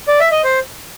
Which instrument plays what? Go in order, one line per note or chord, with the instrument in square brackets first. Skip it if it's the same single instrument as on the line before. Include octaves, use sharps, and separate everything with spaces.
[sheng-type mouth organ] D5
E5
D#5
C5